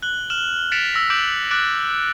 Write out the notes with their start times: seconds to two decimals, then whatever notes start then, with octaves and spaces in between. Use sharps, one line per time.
0.02 F#6 F#7 G7
0.30 F6 E7 F#7 G7
0.72 A6 B6 C#7 D7 E7 F7
0.93 E6 A#6 B6
1.10 D6 G6 D7 F#7
1.51 D6 F#6 A6 D7